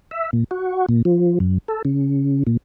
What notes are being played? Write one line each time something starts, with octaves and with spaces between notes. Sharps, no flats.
E5
A#2
F#4
A#2
F3
F#2
A4
C#3
A#2